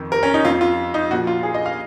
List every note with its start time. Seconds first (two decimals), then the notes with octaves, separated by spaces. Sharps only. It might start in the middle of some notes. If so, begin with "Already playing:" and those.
Already playing: F2 D#3
0.12 A#4
0.23 C#4
0.34 D#4
0.45 F2 F3 F4
0.61 F4
0.94 D#4
1.11 A#2 F3 F#4
1.27 F4
1.43 G#4
1.54 D#5
1.66 F5